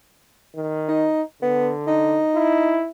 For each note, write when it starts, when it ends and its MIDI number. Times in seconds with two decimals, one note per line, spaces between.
0.56 1.08 51
0.88 1.22 63
1.42 2.22 50
1.42 1.70 59
1.87 2.80 63
2.35 2.89 64